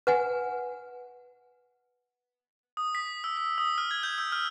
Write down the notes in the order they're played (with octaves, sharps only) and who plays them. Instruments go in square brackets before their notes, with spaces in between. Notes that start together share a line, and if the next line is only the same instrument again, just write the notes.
[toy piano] B4 F#5 G#5
[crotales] D#6
B6
E6
E6
D#6
F6
G#6
G6
E6
F6